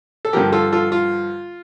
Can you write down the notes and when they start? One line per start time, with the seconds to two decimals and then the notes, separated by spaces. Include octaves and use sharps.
0.25 A4
0.33 G2 D3 F3 G4 A#4
0.52 F4 A4
0.72 F4 A4
0.92 F4